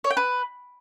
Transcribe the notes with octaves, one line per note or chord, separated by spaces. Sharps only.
C#5
G5
B4